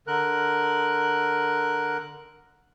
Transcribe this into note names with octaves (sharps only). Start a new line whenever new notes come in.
D3 A#4 F#6